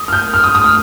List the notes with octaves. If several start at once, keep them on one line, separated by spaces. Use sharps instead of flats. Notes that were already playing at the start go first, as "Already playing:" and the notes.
Already playing: D#6
F6
G6
F6
D#6
D#6
F6